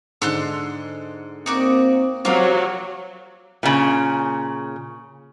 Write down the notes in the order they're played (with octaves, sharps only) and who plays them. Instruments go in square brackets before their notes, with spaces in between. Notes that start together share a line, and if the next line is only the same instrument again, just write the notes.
[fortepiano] G#2 D3 [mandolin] A4 C6 F#6
[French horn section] A#3 C4 [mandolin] D#4 F#4 D5
[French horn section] C3 C5 [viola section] F#3 [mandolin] A#3 F5 [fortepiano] F4
[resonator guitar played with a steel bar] A#2 C#3